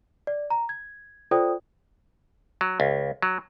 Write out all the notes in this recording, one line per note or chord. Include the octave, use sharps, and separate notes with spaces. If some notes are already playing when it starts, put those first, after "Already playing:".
D5
A#5
G#6
F4 A4 C5 D5 G5 D#6
F#3
C#2
F#3